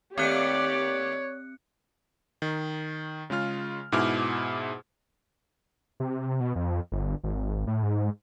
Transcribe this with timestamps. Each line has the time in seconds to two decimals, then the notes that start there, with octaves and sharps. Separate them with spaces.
0.18 D#2 A3 C4 G4 C#5 D5 F#6 C#7
2.42 D#3
3.30 C#3 G#3 F4 F6
3.92 G#2 B2 E4 G#4 D6 F6
6.00 C3
6.40 B2
6.56 F2
6.92 G1
7.24 G#1
7.67 A2
7.83 G#2